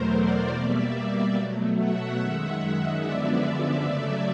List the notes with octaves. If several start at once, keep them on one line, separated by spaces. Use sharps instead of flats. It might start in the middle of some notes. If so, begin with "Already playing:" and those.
Already playing: E2 B2 F#3 A3 A#4 C5
C5 D5
B2 G3 A#3 D5 E5
B2 F#3 A3
E5 F#5
F#2 D#3 G#3
F#2 D3 F3 G#3 B3 D5 E5
C#3 F#3 A3 D5 E5